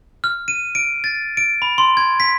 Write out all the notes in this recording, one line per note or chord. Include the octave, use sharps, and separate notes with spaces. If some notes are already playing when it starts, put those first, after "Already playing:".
F6
D#7
D7
A6
D7
B5
C6
G#6
B6